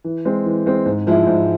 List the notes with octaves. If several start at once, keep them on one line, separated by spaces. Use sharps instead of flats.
E3
G#3 C4
E3
G#3 C4
G#2
F3 G#3 E4
G#2